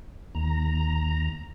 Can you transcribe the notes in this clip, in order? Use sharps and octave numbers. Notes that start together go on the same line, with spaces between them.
D#2 A#5